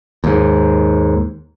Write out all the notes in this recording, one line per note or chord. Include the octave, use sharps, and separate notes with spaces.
D#2 G#2